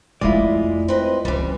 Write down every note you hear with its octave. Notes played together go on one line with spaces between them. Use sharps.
F2 G#3 A3 E4 F4 D5
C4 B4 D#5
C#2 E3 G3